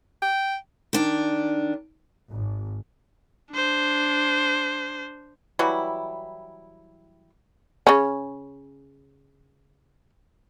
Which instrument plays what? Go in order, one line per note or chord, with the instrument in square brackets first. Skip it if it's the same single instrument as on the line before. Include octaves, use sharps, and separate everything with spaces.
[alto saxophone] G5
[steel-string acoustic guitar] D#3 D4
[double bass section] G#1
[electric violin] D4 C5
[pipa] E3 F#3 G3 E4
[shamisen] C#3 C#4